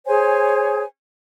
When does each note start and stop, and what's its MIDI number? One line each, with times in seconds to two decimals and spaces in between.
0.07 0.83 68
0.07 0.83 72
0.07 0.83 73
0.07 0.83 80